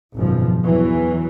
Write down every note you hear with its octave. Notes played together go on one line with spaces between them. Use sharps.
G#1 F#2 B2 F3
E2 E3 F#3